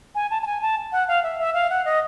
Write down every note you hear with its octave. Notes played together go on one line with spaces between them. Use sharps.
G#5
A5
A5
G#5
A5
F#5
F5
E5
E5
F5
F#5
D#5